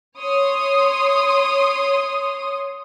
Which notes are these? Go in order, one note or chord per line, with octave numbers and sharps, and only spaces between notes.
C#5 C6 D#6